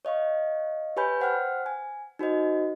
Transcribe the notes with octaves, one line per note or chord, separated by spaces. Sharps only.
C#5 D#5 F5 C#6
G4 B4 C#5 G#5 B5 G6
C5 F#5 G5 F6 F#6
G#5
D#4 F#4 C5 D#5